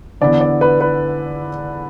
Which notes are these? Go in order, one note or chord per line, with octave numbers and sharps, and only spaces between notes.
E2 D3 B3 E4 D5
D5
B4
B4